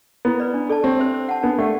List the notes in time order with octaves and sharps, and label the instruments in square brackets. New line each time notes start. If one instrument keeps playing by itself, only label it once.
[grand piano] B3 [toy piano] E4
[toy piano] B4 D5
D4
A4 D5 A5
[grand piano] C4 [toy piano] G4
[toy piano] C5 E5
C5
F#5 A5
[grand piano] B3 [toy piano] D4
[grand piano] A3 [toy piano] G4 D5 F#5